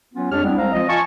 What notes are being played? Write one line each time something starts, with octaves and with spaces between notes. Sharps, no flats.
F#3 B3 C#4 F4
F2 G#3 D4 G4 C#5 F6
G3 G#3 B3 C4 D4 E4
C2 G#3 C4 C5 F5 A#5
F3 C4 F4 D#5
F4 F5 G#5 A5 C#6